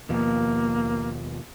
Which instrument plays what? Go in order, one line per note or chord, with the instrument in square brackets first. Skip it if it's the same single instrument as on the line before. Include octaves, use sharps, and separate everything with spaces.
[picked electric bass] D#2 B2 F3 [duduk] A#3